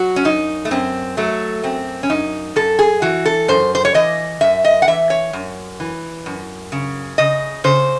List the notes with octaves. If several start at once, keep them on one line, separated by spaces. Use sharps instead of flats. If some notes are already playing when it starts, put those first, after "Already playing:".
Already playing: F#3 F#4
C#4
F#2 D#4
A3
F#2 C4
F#3 A3
F#2 C4
C#4
F#2 D#4
F#2 A4
G#4
E3 F#4
A4
F#2 C5
C5
C#5
E3 D#5
F#2 E5
D#5
F#5
E3 E5
C#5
F#2
E3
F#2
C#3
C#3 D#5
C#3 C5